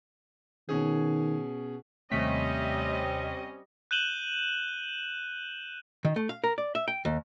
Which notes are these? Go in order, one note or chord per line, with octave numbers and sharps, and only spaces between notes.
B2 D#3 C#4 G#4
D#2 C3 G3 A3 C4 C#4 D#5 B6
F#6 G6 D#7 E7 F#7 G7
D#3
A3
F5
A#4
D5
E5
G5
D#2